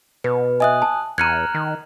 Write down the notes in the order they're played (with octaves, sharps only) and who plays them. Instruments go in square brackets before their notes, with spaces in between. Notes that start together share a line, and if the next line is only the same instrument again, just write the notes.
[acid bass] B2 [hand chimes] B4
[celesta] D#5 E5 [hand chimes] G#5 D#6 F#6
[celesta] A5
[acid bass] E2 [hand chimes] A#5 F6 F#6 [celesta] G#6 C#7 D#7
[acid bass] D#3